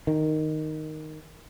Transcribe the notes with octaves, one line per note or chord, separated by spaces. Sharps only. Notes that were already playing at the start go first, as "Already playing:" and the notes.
D#3